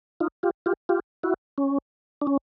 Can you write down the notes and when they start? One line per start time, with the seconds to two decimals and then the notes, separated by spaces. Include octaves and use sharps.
0.20 D#4 F4
0.43 F4 G4
0.66 F4 G4
0.89 F4 G4
1.23 E4 F#4
1.58 C#4
2.22 D4
2.27 C#4